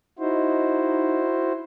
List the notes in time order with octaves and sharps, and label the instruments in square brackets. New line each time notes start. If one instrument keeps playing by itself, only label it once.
[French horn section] D#4 [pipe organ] E4 F#4 C5